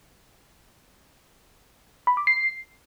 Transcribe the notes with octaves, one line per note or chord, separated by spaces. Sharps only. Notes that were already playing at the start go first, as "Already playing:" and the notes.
B5
D6
C7